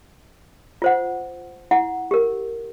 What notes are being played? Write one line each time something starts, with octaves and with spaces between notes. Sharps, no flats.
F4 C5 F#5
E4 F#5
G4 A#4